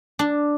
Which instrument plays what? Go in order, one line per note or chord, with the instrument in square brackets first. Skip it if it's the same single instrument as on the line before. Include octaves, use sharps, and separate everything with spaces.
[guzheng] D4